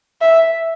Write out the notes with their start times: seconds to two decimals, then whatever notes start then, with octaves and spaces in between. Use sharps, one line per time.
0.21 E5